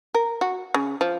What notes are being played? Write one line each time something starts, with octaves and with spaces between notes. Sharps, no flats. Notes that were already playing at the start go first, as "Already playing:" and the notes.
A#4
F#4
C#3
F3